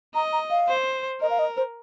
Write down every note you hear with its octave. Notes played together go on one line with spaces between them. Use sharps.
D#5 A#5
A#5
F5
C5
A#4 D#5
F5
D#5
C5